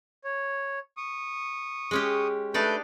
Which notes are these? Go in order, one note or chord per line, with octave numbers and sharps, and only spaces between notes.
C#5
C#6 D#6
G#3 C#4 G4
A3 D4 D#4 B4 D5 G6